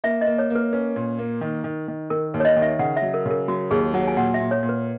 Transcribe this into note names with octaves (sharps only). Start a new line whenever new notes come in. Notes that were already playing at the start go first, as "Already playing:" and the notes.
A#3 E5
D#5
A#3
C#5
A#3
B4
C#4 B4
A#2
A#3
D#3
D#3
D#3
D#3 A#4
D#2
C#5
D#5
D#3
E5
C#3 F#5
E5
F#3
A#4
C#3
A#4
F#3 F#4
D#2 G#4
F#3 F#5
G#5
A#2 F#5
E5
A#2
C#5
A#2
B4